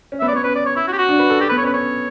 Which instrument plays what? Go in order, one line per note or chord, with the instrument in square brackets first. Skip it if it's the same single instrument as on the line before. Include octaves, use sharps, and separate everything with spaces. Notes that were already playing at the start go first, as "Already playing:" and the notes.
[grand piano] C#4
[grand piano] B3 [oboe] E5
[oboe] D5
[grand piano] B3
[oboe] C#5
[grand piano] C#4 [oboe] B4
[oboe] D5
C#5
E4
F#4
G4
F#4
[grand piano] D4
B4
A4
[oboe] G4 [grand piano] A4
[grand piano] B3 [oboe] B4
[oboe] C#5
[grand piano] C#4
[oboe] B4
[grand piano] C#4 [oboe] C#5